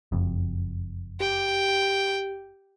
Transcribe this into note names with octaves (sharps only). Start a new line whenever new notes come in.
F#1 F2
G4 G5